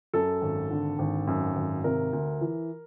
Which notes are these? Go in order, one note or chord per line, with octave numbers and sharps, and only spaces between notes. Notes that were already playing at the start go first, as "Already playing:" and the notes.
F#2 A4
G#1
D3
G#1
F#2
G#1
C3 A#4
D2
E3